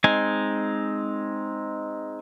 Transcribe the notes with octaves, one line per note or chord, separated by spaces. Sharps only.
G#3 C4 D#4 G#5